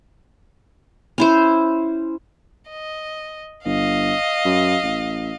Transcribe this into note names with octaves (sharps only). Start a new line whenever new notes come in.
C#4 E4 C5
D#5
G1 D#5 F5
F#2
A1